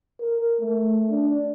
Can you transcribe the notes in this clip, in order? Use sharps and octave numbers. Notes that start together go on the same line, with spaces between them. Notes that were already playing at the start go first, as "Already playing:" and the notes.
A#4
A3
D4